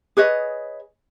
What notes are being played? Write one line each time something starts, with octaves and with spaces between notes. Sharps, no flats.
G#4 B4 C#5 D#5